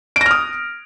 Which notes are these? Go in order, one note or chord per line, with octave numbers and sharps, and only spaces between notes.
D#6 F6 A#6 D7